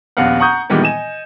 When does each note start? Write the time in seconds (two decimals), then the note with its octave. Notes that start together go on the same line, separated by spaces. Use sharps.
0.17 D#1 A#1 B3 F5 F#5
0.40 F#5 A#5 C#6 D#6 G6
0.70 A#2 D#3 E3 G3 G#3 B3
0.82 D#5 G#5 E7